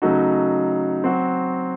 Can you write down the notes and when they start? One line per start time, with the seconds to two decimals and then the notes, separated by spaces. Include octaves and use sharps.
0.02 C#3 F#3 A3 D#4 F#4
1.04 F#3 C4 F#4